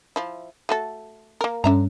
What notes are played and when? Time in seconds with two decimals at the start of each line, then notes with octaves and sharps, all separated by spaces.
0.16 F3 E4
0.69 A3 F#4 A4
1.41 A#3 A#4
1.64 G2 D3 C#4 E5 A#5